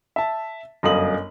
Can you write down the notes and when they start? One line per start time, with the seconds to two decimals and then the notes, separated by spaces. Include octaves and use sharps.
0.16 E5 A5
0.83 G1 F#2 D#5 F5 D#6 F#7